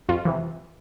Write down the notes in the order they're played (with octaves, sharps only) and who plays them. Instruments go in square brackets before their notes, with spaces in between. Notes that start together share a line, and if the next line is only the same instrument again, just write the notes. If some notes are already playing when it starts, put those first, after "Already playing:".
[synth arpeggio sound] F2 F4
C3 E3